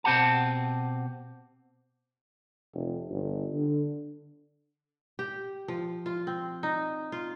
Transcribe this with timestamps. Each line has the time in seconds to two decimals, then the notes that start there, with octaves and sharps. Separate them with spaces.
0.04 B2 C4 G4 F#5 A5
2.74 F1
3.10 G1
3.53 D3
5.19 G4
5.68 F3
6.06 F4
6.27 C4
6.63 D#4
7.12 F4